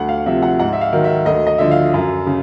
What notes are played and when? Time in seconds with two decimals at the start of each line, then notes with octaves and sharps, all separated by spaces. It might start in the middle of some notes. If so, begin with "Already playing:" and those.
Already playing: D2 F#5
0.09 F5
0.26 C3 F3 E5
0.42 F#5
0.59 G#2 F#5
0.73 E5
0.81 F5
0.93 D#3 F#3
1.04 E5
1.26 D2 D#5
1.47 D#5
1.58 D3 F3 E5
1.71 F5
1.94 F#2
2.26 C#3